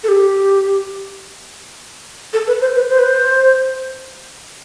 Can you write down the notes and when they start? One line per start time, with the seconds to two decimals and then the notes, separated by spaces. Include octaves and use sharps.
0.04 A4
0.08 G4
2.33 A4
2.47 B4
2.61 C5
2.75 B4
2.90 C5
2.99 B4
3.08 C5